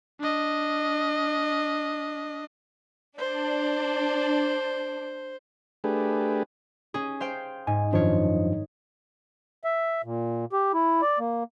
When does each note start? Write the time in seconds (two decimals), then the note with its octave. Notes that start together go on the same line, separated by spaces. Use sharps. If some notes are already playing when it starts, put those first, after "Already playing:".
0.20 D4 D#5
3.18 D4 C5
5.84 A3 D4 G4 G#4 B4
6.94 C#4 G#4
7.20 C5 F5 G5
7.67 G#2 G#5
7.93 F#2 D#3 F3 D4 C#5
9.64 E5
10.04 A#2
10.53 G4
10.74 E4
11.02 D5
11.19 A#3